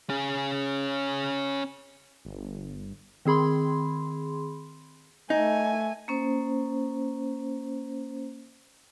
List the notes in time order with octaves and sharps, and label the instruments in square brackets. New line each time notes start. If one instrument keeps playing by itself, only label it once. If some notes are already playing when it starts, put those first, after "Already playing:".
[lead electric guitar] C#4 G#4
[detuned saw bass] G1
[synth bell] D#3 C4 G#4 B5 C6
[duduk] A3 [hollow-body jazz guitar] D#4 [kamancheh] G#5
[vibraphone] A#3 C#4 C5